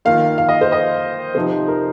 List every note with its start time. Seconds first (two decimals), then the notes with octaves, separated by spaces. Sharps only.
0.05 D#3 A#3 F4 F5
0.38 F5
0.49 D#5
0.61 C5
0.72 D#5
1.35 C3 F3 C4 D#4 C5
1.68 A#4